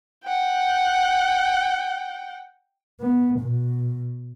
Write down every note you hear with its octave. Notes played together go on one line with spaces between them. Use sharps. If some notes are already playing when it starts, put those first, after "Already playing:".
F#5 G5
B3
B2